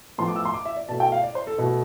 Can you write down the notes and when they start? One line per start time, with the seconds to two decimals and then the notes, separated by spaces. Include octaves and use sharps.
0.18 A2 F3 B3 C6
0.28 D6
0.36 E6
0.45 C6
0.54 D6
0.66 E5
0.77 D5
0.89 B2 A3 A5
1.00 G5
1.12 F5
1.23 D5
1.35 C5
1.47 A4
1.58 B2 A3